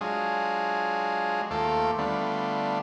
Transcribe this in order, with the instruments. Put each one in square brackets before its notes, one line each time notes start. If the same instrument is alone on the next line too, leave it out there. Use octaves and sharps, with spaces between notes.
[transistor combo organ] F#3 G#3 D4 F4 G#4
D#2 A3 F4 A4 C5 D6
D3 G3 A3 B3 D4 F4